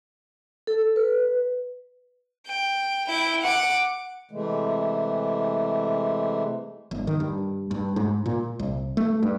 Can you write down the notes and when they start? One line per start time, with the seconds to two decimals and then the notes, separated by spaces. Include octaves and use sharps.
0.67 A4
0.96 B4
2.48 G5
3.08 E4 G5
3.43 F#5 D6
4.31 C3 E3 G#3 A3
6.91 G1
7.07 D#3
7.20 G2
7.71 G2
7.96 G#2
8.26 A#2
8.59 C2
8.97 A3
9.23 G2